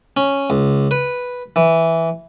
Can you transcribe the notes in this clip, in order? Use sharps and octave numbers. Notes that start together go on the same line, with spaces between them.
C#4
C#2
B4
E3